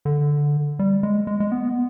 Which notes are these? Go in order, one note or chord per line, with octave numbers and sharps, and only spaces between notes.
D3
G3
G#3
G#3
G#3
B3